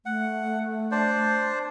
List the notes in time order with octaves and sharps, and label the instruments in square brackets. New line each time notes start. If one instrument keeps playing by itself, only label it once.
[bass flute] A3 [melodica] F#5
[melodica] D4 C5 D5